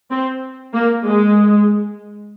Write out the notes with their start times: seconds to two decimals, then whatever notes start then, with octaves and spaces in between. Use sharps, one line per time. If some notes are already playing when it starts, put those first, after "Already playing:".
0.11 C4
0.74 A#3
1.06 G#3